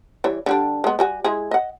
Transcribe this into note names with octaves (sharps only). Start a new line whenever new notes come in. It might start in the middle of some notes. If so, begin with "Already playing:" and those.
E3 G3 C#5
D3 G3 D4
G#3 B3
G3 F#4 G#5
G#3 E4 G#4
D#5 F#5